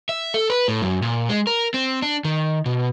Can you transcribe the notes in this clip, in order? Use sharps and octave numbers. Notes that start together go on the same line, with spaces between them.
E5
A4
B4
A2
F#2
A#2
G#3
A#4
C4
D4
D#3
B2